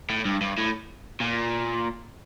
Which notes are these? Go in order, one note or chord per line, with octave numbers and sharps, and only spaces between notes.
A2
G2
G2
A2
A#2